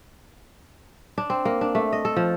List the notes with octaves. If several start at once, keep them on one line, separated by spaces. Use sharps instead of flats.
D4
C4
A#3
D4
A3
D#5
A4
F3